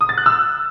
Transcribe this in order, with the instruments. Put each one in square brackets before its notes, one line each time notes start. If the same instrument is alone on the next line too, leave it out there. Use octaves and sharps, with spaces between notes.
[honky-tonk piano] D#6
A6
F#6
E6